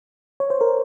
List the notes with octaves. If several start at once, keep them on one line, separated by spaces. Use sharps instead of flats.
C#5
C5
A#4